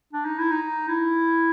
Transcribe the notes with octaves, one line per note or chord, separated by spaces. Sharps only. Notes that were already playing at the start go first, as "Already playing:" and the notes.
D4
D#4
E4
D#4
E4